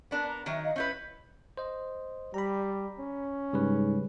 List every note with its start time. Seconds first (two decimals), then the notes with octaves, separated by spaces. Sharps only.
0.11 B3 D4 A#4
0.26 A#5
0.46 D#3 F#3 D#4 E5
0.64 D#5 F5
0.76 C#4 E4 B4 G6
1.57 C5 D#5
2.34 G3 A#5 B5
2.99 C#4
3.53 G#2 C#3 G3 B4